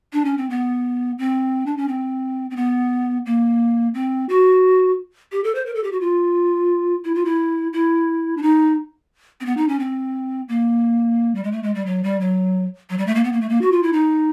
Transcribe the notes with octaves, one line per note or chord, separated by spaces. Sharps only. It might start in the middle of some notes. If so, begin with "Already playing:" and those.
D4
C#4
C4
B3
C4
D4
C#4
C4
C4
B3
A#3
C4
F#4
G4
A4
C5
A#4
A4
G4
F#4
F4
E4
F4
E4
E4
D4
D#4
C4
B3
D#4
C#4
C4
A#3
G3
G#3
A3
G#3
G3
F#3
G3
F#3
F#3
G3
A3
A#3
B3
A#3
A3
A#3
F#4
F4
E4
D#4